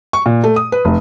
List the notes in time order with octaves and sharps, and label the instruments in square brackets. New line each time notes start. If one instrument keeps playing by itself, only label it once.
[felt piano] C#6
A#2
A3
D#6
B4
F1